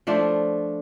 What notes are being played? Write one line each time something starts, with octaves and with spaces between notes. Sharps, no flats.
F3 A3 D4 F4